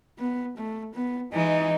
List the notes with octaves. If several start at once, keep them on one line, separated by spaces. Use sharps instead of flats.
B3
A3
B3
E3 G#3 D#4